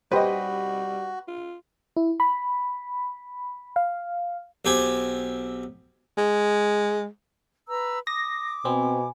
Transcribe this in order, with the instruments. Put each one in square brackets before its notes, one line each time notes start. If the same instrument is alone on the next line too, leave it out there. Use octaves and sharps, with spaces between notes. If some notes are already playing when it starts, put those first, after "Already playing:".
[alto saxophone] G3 [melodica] F#4 [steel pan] G4 C5 [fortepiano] B4 D#5
[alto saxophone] F4
[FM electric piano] E4
B5
F5
[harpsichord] B1 C4 G4 G#5
[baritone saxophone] G#3
[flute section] B4 A#5 E6
[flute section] D6 [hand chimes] D#6 [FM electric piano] A#6
[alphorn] B2 [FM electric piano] C4 [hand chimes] G#5 B5